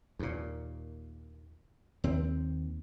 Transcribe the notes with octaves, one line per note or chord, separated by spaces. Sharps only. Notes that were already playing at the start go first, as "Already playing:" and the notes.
D#2 A#2
D#2 C4